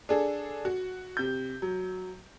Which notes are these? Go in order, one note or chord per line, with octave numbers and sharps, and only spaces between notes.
D4 G#4 A4
F#4
C3 G6
F#3